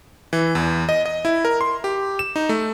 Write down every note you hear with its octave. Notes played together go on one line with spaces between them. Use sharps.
E3
E2
D#5
D#5
E4
A#4
C6
G4
E7
D#4
A3